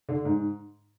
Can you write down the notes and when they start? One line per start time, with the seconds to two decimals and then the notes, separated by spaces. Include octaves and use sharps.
0.09 D3
0.25 G#2